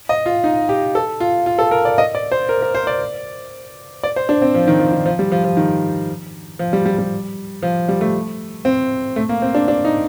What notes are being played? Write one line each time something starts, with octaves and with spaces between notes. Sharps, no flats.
D#5
F4
D#4
G4
A4
F4
F4
A4
A#4
D5
D#5
D5
C5
A#4
A#4
C5
D5
D5
C5
D4
C4
F3
D#3
F3
D#3
F3
G3
F3
F3
D#3
F3
G3
G3
G3
F3
G3
A3
C4
A3
A#3
C4
D4
D4
D#4